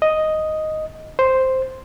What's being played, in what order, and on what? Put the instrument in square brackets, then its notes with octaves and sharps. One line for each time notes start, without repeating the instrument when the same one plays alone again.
[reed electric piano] D#5
C5